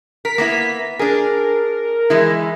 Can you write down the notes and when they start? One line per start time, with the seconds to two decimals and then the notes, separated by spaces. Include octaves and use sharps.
0.25 A#4 B6
0.38 A#3 B3 E4
0.99 D4 G#4 A#4
2.10 E3 G#3 E4